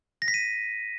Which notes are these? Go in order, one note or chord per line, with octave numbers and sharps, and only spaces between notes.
A#6
B6
D#7